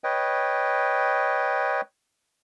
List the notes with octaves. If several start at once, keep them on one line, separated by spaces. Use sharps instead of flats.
B4 C#5 D#5 G5